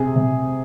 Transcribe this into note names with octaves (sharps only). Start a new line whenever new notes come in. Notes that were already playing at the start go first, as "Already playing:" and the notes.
Already playing: C3 G#4
C3